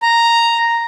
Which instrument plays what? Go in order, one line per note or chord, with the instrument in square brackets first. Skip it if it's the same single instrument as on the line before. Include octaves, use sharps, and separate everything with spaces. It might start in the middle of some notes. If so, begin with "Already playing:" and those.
[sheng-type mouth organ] A#5